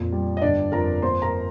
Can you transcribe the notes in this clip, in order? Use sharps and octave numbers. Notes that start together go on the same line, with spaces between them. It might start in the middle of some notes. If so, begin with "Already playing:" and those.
Already playing: F2 A#2 A#3
G3
D#5
G1 D4 D5
F2 A#4 A#5
A#3 C5 C6
A#4 A#5